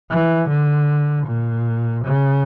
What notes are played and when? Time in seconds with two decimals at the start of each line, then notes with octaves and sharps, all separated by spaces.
0.10 E3
0.49 D3
1.27 A#2
2.05 C#3